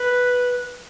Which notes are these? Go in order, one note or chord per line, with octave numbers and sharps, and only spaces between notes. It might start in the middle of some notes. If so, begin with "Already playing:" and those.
Already playing: B4